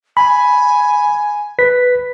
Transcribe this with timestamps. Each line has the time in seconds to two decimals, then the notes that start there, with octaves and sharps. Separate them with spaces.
0.17 G#5 B5
1.59 B4 B6